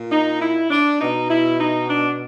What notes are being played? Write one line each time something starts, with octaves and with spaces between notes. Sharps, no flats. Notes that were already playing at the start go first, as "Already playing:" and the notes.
Already playing: A#2
D#4
E4
D4
B2 D#4
E4
D#4
D4